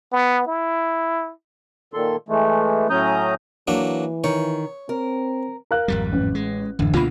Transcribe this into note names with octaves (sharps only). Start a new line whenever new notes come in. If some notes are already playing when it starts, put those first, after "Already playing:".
B3
E4
A#2 D#3 A4 C6
E3 G#3 A3
A2 F#3 C#4 A#5 D#6 G6
E3 F#3 A#3 D4
D#3 C#5
C4 A#4
A#4 F5 F#6
G#1 F2 G3
A1
G#3
D1 F#2 D3 E3
C#2 B2 A#3 F4 B5